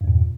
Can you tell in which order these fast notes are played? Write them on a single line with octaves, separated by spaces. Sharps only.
G2 E2 A#2